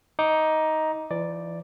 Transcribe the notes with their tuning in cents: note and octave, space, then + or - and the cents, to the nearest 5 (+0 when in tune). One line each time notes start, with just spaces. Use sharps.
D#4 +10 D6 +0
E3 +40 D5 +0